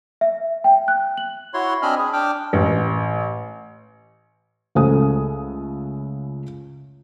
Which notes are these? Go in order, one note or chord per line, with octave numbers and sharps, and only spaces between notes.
E5
G5
F#6
F#7
E4 F#4 C#5 C6
C4 D4 D#5 G#5 B5 F6
G#4
D4 G5 D6 F6
A1
C#2 A3 C#4 A4 G#5 D#6